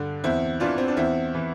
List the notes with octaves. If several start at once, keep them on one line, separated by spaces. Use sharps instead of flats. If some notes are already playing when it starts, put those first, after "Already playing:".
Already playing: G2 D3
E2 C4 E4
E3 D4 F4
C4
D4
E2 C4 E4
E3